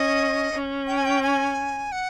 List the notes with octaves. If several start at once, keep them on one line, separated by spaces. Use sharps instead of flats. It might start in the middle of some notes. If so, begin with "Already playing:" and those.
Already playing: C#4 D#5
C#4
G5
G#5
G5
G#5
F#5